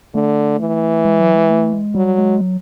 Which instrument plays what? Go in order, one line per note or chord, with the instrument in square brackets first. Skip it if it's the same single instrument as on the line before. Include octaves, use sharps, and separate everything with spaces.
[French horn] D3 [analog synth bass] A3
[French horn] E3
[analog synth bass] G#3
F#3
G#3
A3
G#3
[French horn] F#3 [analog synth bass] G3
[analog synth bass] G#3
F#3